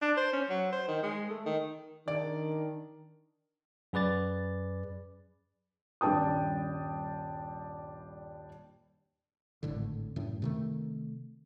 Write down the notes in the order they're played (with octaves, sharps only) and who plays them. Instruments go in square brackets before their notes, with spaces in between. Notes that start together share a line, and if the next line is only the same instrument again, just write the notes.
[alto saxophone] D4
C5
C#4
F#3
C5
D#3
G#3
A3
D#3
[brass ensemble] D#3 D4 [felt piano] D5
[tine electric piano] F#2 G#4 B4 D5 A6
[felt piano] D#1 G2 D4 G5 A5 D#6
[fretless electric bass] G#1 A2 D3
F#2 A2
C3 D#3 A3